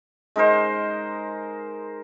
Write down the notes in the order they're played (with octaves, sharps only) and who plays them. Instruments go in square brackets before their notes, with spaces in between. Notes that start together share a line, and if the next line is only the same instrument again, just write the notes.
[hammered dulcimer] G#3 D#4 A#4 C5